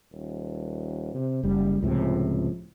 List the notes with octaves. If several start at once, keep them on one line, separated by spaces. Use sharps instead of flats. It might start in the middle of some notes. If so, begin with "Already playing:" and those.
D#1
C3
F#1 G3
C#2 A2 C3 F3